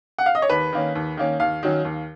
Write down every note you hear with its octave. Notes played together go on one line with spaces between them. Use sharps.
F#5
F5
D#5
C#5
D#2 B4
D#3 A#3 C#4
D#2
D#3 A#3 C#4
D#2 F5
D#3 F#3 C#4
D#2